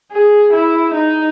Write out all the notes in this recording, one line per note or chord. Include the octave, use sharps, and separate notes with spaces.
G#4
E4
D#4